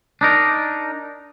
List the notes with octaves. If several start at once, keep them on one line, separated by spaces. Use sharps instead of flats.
D4 D#4 A#4